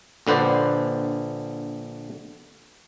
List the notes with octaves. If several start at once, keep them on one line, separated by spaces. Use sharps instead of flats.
A#1 D3 B4 C5 D5